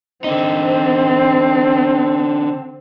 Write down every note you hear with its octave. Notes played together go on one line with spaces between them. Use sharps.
D3 C4 D#4